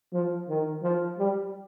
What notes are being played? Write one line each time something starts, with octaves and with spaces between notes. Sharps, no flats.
F3
D#3
F3
G3